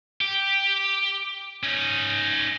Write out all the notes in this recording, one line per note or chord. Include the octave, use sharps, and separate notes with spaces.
G4
C#4 D#4